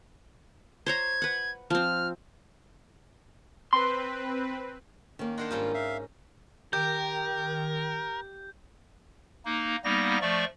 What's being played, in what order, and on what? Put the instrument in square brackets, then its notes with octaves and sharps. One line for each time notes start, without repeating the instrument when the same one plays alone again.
[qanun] C5 C#5 A#5 [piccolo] G#6
[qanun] B4 F#5
[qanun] F3 C4 [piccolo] F6
[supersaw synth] C4 B4 [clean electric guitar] C6
[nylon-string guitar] D#3 A#3 [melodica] C#4
[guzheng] D4 A#4 C5 [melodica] D#5 F#5 C6
[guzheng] G#2 C#4 D#4 [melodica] G3 F4
[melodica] E5 F5
[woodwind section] D#3 [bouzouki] G4 [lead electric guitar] A#4 [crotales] G6
[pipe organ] A#3 D#4
G3 A#3 B3 D#4 A#6
F3 A3 D5 C#6